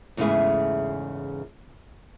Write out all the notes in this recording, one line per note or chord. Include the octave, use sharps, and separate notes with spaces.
E2 G#2 C#3 A3 E4 G#4